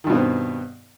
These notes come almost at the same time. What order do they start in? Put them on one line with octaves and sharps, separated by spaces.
D#3 G2 B2 C4 B3